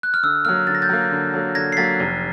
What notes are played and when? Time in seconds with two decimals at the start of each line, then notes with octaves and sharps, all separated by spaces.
0.03 F#6
0.14 F6
0.23 D3 E6
0.45 F#3 A#3 F6
0.67 D3 A6
0.75 A#6
0.82 G6 A6
0.89 F#3 A#3
1.11 D3
1.33 F#3 A#3
1.55 D3 G#6 A#6
1.72 C7
1.77 F#3 A#3 A6 B6
2.00 F1